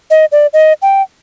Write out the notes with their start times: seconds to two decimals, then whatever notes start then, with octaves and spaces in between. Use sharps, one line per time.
0.10 D#5
0.32 D5
0.53 D#5
0.82 G5